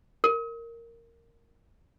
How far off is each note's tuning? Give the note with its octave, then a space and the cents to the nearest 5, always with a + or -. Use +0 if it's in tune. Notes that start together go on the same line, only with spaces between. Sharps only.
A#4 -10